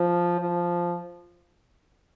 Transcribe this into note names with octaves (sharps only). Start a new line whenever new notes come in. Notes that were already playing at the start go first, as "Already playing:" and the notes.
Already playing: F3
F3